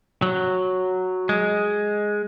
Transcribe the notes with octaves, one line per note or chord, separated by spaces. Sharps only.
F#3
G#3